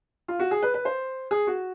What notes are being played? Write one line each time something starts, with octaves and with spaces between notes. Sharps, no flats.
F4
F#4
G#4
B4
B4
C5
G#4
F#4